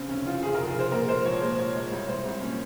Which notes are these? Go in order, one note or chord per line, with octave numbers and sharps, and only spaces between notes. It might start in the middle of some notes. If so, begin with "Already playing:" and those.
Already playing: C#3 C4
F1 C#4
C#3 F4
F1 G#4
A#4
F1
G#4
F1 C5
A#2 A#4
G#3 C5
F3 C#5
A#2 C5
A#2 C#5
G#3
C2 C#5
C2 C5
C2
A#2 C#4